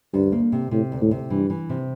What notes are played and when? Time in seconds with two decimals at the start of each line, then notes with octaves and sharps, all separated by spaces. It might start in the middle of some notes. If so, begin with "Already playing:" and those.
0.14 D2 G2
0.32 A#3
0.52 C3
0.71 A2 C3
0.92 D2
1.01 A2
1.11 C3
1.30 G2 E3
1.50 E3
1.69 C3